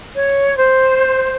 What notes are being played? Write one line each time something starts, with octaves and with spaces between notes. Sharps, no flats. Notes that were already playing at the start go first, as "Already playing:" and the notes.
C#5
C5